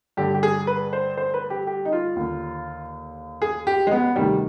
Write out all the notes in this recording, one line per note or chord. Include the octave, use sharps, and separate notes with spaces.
G2 D3 G4
G4
G#4
B4
C5
C5
B4
G4
G4
D#4
F4
D#2 D3
G#4
G4
G#3
B3
D2 C3 D#3 G3